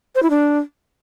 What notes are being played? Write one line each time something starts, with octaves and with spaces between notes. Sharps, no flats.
C5
E4
D4